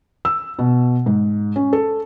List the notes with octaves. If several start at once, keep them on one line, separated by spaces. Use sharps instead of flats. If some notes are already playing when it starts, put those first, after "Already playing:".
E6
B2
G#2
C#4
A4